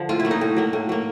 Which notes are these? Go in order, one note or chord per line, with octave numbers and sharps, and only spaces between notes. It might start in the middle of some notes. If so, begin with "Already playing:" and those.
Already playing: D3 F3
A2 F4
E4
F#3 A#3
D#4
A2
F#3 A#3
A2
F#3 A#3